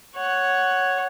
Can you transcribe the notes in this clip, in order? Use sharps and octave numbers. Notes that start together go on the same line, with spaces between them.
C#5 F#5